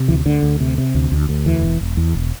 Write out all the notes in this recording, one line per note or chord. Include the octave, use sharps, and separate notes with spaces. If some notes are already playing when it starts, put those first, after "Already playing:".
Already playing: C3
D2 E3
D2 D3
D2
C3
C3
D2
D2
D2
E2 E3
E1
E1
E2
E1